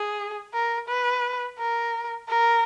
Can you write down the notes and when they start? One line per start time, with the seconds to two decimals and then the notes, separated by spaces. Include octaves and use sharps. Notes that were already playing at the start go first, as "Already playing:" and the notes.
Already playing: G#4
0.54 A#4
0.88 B4
1.58 A#4
2.29 A#4